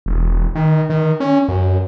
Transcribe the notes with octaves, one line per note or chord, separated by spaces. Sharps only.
E1
D#3
D#3
C#4
F#2